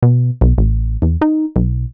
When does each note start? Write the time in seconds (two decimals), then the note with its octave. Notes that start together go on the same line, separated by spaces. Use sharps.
0.02 B2
0.41 B1
0.58 A1
1.02 E2
1.21 D#4
1.56 B1